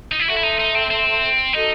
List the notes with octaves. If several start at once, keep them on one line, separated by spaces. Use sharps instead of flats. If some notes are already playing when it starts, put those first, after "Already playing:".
D#4
E4
F#4 A4 E5 A5 C6
E4
D#4
D#4
C4
C4
D#4 F#4 A4 D#5